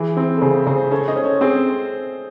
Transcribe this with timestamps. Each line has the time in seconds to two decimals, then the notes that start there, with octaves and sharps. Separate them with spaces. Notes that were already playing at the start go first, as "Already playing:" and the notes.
Already playing: E3 E4 G#4
0.17 C4
0.37 A4
0.41 C#3 G#4 C5
0.66 C#3 G#4 C5
0.91 C#4 A4 C#5
1.08 C5 D#5
1.16 C#4
1.24 A4 C#5
1.41 C4 G#4 C5